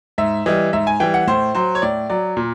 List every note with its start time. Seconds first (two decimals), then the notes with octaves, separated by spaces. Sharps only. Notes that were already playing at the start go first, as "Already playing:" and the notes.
0.18 G#2 E5
0.46 E3 G3 D#5
0.73 G#2 E5
0.87 G#5
1.00 E3 G3 G5
1.14 F#5
1.27 A2 C5
1.55 F#3 C5
1.75 C#5
1.82 A2 D5
2.10 F#3 D5
2.37 A#2